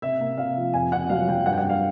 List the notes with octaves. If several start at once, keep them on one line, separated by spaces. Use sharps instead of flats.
C3 E5
A#3
C3 F5
F3
F2 G#5
C3 F#5
F#3 F5
F#3 G5
G2 F#5
G5
F#5
A#3 F5